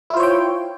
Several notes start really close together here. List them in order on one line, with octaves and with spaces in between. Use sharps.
E4 F4 C5 C#5 G5